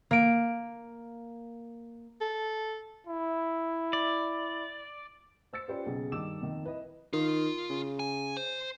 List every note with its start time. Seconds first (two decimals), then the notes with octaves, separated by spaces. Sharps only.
0.11 A#3 D7
2.20 A4
3.07 E4
3.93 D5
5.53 C5 E6 A6 C#7
5.68 C#4 F4 G4 B4 C5 D5
5.86 B1 C#3 G#4
6.12 G2 D#3 D6 E6 E7
6.41 F2 D#3
6.63 E4 B4 D#5
7.13 D#3 F4
7.70 C#3
7.99 G#5
8.37 C5